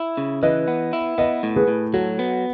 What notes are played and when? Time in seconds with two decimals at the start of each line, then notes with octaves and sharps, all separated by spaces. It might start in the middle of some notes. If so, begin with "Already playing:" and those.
Already playing: E4
0.17 C#3
0.43 E3 B4 D#5
0.68 B3
0.93 E4
1.18 B3 B4 D#5
1.43 A2
1.56 G#4 B4
1.68 A2
1.93 F#3 F#4 A4
2.19 B3